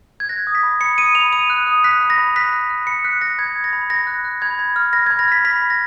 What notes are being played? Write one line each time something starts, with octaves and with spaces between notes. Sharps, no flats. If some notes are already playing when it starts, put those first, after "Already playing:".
G#6
F#6 A#6
D#6
B6
B5
B5 C#7
D#6 D#7
B5 F7
B5 D#7
F#6
D#6
F#6 B6
B5
A#6
B5
F#6 B6
F#6
F#6
B5 C#7
F#6 B6
F#6 A#6
B5 G#6
B5
A#6
B5
B5 A#6
F#6
F#6
B5 G#6
B5
F6
B5 A#6
B5 G#6
A#6
F6 B6
B5 B6
B5
A#6